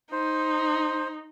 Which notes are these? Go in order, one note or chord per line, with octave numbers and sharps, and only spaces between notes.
D#4 C5